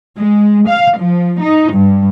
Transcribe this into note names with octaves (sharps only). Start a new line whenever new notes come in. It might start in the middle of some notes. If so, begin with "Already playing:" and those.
G#3
F5
F3
D#4
G2